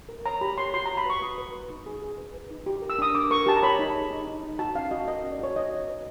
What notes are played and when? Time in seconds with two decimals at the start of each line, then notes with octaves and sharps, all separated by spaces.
0.09 A#4
0.25 C#5 A#5
0.41 G4 B5
0.58 C#5 C6
0.74 F#4 C6
0.86 F#4 A#5
0.97 B5
1.06 B4 C#6
1.22 F#4 D#6
1.38 B4
1.54 B4
1.70 D#4
1.86 G#4
2.02 G#4
2.18 B4
2.34 B4
2.51 D#4
2.66 G4
2.82 A#4
2.90 E6
2.99 D4 D#6
3.15 A#4 D6
3.31 A#4 C#6
3.46 G4 A5
3.56 A#5
3.63 C#5 B5
3.79 D#4
3.95 G#4
4.11 D#4
4.27 D#4
4.43 D#4
4.59 F#4 A5
4.75 C#4 F5
4.91 F#4 D#5
5.08 A#4 D#5
5.24 C#4
5.32 D5
5.40 F#4 C#5
5.55 D#4 D#5
5.72 F#4
5.88 B4